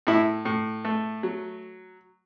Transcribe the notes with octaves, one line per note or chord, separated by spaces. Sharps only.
A2 E4
A2
A3
F#3